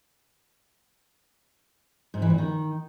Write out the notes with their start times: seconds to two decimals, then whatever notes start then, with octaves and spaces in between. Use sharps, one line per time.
2.14 G#2
2.22 E3
2.30 E2
2.38 D#3